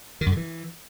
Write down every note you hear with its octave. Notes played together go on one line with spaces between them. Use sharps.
D#3
F#2
D3
E3